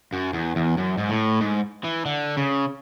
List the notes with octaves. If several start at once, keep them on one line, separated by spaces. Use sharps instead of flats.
F#2
E2
E2
F#2
G#2
A2
G#2
E3
D3
C#3